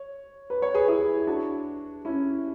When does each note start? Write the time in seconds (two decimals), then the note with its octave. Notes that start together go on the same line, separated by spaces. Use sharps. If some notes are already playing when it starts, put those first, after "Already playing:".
Already playing: C#5
0.50 B4
0.62 C#5
0.74 G#4 B4
0.88 E4 G#4
1.27 D4 F#4
2.05 C#4 E4